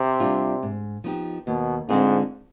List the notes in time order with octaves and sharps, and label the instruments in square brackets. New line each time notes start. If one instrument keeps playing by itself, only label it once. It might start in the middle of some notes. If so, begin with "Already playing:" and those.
Already playing: [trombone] C3
[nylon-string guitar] G3 D4 F4
G#2
F3 B3 D#4 G4
[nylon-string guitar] D#2 [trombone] B2
[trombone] G#2 [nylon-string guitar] D3 G#3 C4 F4